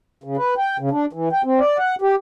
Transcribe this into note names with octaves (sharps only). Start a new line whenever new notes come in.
C#3
B4
G5
C#3
D4
E3
G5
C4
D5
F#5
G4